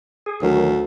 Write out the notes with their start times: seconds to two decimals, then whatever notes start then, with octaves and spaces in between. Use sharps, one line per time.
0.26 G#4
0.42 D2 D#3 F#3